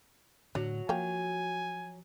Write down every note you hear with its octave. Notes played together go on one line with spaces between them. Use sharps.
A2 D3 F#3 D4
F3 A#3 C#5 G5 G#5